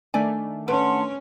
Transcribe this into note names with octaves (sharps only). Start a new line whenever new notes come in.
D#3 A3 D4 D5 G#5
C#4 B4 F#5 A5 C6